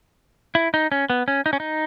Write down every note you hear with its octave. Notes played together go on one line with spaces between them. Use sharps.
E4
D#4
C#4
B3
C#4
D#4
C#4
D#4